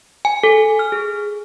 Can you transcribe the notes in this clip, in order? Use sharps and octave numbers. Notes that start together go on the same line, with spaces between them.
G#5
A4
F6
G#4